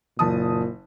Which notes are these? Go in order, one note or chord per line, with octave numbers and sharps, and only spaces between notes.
F#1 A#2 A5 D#6